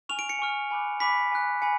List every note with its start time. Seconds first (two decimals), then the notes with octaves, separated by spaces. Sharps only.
0.09 G#5 C#6 F6 F7
0.19 D7
0.29 C#7
0.39 G#5 C#6 F6
0.71 G#5 B5 D6 F#6
1.00 G#5 B5 D6 F#6 B6
1.32 G#5 B5 F#6
1.62 G#5 B5 C#7